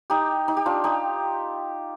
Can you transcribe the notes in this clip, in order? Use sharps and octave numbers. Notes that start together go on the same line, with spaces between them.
D#4 G4
D#4
G4
D4 F4
D#4 G4